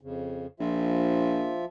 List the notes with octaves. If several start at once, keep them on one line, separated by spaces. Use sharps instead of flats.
F2 C#3
A#1 F3 F4 E5